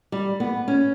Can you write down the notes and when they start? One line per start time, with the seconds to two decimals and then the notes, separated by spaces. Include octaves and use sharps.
0.12 G3
0.40 B3
0.68 C#4